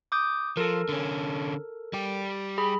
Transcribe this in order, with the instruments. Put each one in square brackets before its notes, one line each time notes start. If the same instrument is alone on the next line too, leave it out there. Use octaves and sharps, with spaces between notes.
[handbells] D6 D#6 G6
[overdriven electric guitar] F3 [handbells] A4 A#4
[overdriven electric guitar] D3 C#4
G3 G4
[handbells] G#4 B5